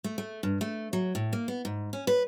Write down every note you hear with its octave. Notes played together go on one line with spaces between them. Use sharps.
A3
A3
G2
A3
F#3
A2
A#3
B3
G#2
C#4
B4